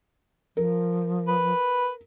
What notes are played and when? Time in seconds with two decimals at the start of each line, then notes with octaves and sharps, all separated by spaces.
0.57 F3 A#4
1.28 B4